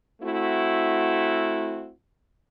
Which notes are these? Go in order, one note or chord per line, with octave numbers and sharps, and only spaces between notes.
A3 C4 E4 F#4